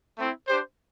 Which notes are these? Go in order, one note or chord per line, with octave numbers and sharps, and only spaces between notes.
A3 C4 E4
D4 G4 C5